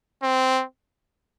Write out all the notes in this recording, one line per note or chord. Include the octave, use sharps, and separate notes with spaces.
C4